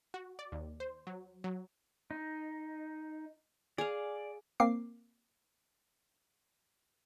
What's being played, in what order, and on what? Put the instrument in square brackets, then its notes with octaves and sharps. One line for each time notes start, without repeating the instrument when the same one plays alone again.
[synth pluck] F#4
D5
D#2
C5
F#3
F#3
[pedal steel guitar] D#4
[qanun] G#4 F5 [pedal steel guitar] D5
[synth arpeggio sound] A#3 C4 D6 C7